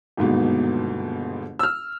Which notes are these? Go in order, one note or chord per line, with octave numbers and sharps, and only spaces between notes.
G1 D#2 G#2 B2
E6 F6